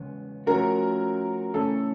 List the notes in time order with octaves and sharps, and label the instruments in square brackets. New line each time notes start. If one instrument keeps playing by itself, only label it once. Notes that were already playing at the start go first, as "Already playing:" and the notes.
Already playing: [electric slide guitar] E2 C#3 G#3 B3
[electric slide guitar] F3 A3 C#4 F#4 [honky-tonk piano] A#4
[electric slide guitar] C#3 E3 A3 C#4 [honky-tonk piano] A4